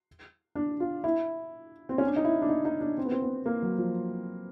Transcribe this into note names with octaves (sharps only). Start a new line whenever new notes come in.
D4
F4
E4
C4
C#4
D4
D#4
E4
D4
D#4
D#4
D4
C4
B3
C4
B3
A#3
F#3
F3